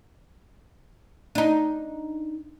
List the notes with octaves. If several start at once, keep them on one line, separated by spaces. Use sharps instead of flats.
D4 D#4